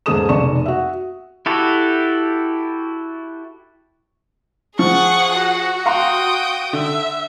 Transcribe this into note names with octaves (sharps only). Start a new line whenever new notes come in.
E1 G#2 G#4 A4 D#6 E7
F1 B1 D5 C#6 E7
F#4 E5
E4 F#4 G4 A4
F3 G#4 F#5 C#6
F#4
F5 G5 A#5 C6 D#6
F#4
D3 E5